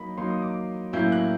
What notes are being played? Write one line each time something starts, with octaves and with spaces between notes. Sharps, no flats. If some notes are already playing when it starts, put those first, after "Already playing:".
Already playing: F#3 A#3 D#4 B5
F#3 A#3 D#4 C6
D#6
D6
A2 F#3 A#3 C#4 E4 G6
F#6